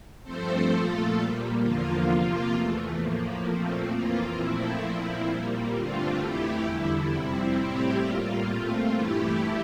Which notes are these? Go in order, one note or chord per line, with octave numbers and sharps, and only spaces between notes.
G2 F3 A3 C4 A4 C5
A#2 F3 A3 F4 A4
A#2 G3 A#3
E2 D3 F3 A#3 F4
C3 F3 A#3
E2 E3 A3
A2 F3 A#3
A#2 F3 A3 C4
F2 E3 A#3 F4
A#2 F3 A3 C4 E4
A#2 F3 C4
A#2 G3 A#3
G2 D3 A3 C4 F4
F2 E3 A3 E4 G4
E2 D3 G3 E4
F2 C3 G3 C4
A2 G3 C4 E4 G4
A2 G3 A#3 F4
A#2 A3 C4
G2 E3 A3 E4 G4